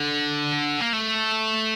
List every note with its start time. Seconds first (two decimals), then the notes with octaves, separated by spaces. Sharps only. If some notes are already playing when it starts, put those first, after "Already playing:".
Already playing: D3
0.81 A#3
0.93 A3